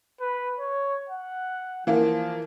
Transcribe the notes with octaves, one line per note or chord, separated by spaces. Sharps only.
B4
C#5
F#5
E3 F3 A#3